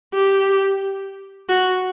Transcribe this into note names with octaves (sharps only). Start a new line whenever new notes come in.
G4
F#4